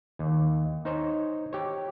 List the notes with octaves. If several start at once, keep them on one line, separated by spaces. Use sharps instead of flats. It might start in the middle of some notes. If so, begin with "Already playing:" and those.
D#2
D#4 C5 C#5
G4 C#5